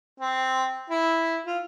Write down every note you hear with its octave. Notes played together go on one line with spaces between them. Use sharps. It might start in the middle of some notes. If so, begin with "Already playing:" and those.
C4
E4
F4